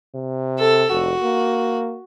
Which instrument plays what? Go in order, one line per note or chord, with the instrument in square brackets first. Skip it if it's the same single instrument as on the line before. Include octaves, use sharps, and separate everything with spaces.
[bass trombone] C3
[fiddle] A4 E6
[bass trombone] F1 [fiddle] F#4
[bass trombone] A#3